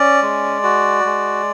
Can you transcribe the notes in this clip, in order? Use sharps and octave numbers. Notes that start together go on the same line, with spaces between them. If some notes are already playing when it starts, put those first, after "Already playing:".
Already playing: C#4 D5
G#3
F#4
G#3